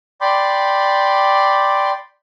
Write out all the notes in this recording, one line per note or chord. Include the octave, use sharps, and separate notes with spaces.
D5 G5 B5 C6 D6